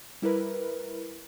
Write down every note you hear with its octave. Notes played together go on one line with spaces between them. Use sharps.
G3 E4 A#4 B4